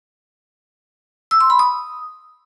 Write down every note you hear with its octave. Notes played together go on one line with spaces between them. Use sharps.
E6
C6
B5
D#6